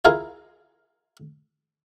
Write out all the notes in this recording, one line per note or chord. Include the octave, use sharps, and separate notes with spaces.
E4 F4 G#4 A#4 D#5 F5